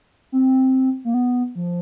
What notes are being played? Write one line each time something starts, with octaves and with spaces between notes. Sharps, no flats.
C4
A#3
B3
F3